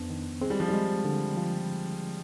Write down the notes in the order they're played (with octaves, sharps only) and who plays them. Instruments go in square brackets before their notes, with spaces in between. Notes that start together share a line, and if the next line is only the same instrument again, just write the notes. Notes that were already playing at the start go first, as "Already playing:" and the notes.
Already playing: [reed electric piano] F2 B3 D4 [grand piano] F3
[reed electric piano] D#3
[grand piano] G#3 [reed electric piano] C4
[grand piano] G3
F3
[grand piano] G3 [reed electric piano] G#3
[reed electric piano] D3
F3